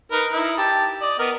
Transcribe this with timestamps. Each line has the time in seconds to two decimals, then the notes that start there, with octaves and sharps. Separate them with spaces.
0.12 D#4 A#4 B4
0.33 D#4 E4
0.58 G4 A5
1.02 D5 D#5
1.19 B3 A#4 D#5